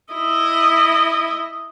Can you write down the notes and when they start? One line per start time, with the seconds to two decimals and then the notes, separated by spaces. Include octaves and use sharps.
0.14 E4 D#5